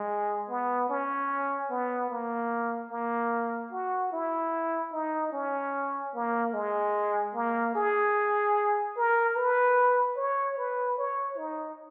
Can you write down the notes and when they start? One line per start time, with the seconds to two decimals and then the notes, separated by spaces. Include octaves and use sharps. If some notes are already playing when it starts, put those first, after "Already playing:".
Already playing: G#3
0.49 B3
0.89 C#4
1.70 B3
2.10 A#3
2.91 A#3
3.72 F#4
4.12 E4
4.93 D#4
5.33 C#4
6.15 A#3
6.54 G#3
7.34 A#3
7.75 G#4
8.97 A#4
9.36 B4
10.17 C#5
10.58 B4
10.98 C#5
11.38 D#4